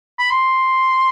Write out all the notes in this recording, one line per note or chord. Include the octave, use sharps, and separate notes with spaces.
B5
C6